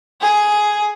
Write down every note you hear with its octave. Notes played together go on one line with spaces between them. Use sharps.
G#4